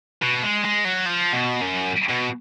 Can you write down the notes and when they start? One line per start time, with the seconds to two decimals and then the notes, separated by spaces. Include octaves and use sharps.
0.23 B2
0.43 G#3
0.65 G#3
0.85 F#3
1.06 F3
1.33 B2
1.62 F#2
2.10 B2